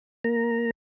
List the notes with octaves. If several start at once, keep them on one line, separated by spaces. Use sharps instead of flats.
A#3 A#5